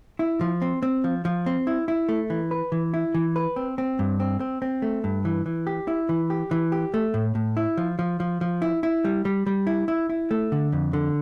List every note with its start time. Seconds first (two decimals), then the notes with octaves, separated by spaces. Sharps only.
0.19 E4
0.41 F3
0.62 C4
0.83 C4
1.04 F3
1.25 F3
1.46 C4
1.67 E4
1.88 E4
2.09 A3
2.30 E3
2.51 B4
2.72 E3
2.94 E4
3.14 E3
3.36 B4
3.56 C4
3.78 C4
3.99 G2
4.20 C4
4.40 C4
4.62 C4
4.82 A3
5.04 G2
5.25 E3
5.46 E3
5.67 G4
5.88 E4
6.09 E3
6.30 G4
6.51 E3
6.72 G4
6.94 A3
7.14 A2
7.35 A2
7.57 E4
7.77 F3
7.99 F3
8.20 F3
8.41 F3
8.62 E4
8.83 E4
9.04 G3
9.25 G3
9.46 G3
9.67 E4
9.88 E4
10.10 E4
10.31 A3
10.52 D3
10.72 F2
10.93 D3